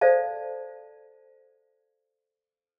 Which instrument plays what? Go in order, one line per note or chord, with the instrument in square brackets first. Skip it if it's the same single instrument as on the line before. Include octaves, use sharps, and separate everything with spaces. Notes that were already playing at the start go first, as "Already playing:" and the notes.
[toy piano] A4 C5 D5 F5 A5